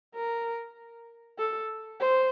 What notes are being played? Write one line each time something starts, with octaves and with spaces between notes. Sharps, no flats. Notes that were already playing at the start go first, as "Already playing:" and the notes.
A#4
A4
C5